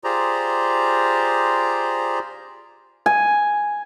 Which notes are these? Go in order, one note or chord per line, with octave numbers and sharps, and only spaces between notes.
F4 G4 G#4 C5 D5 A#5
G#5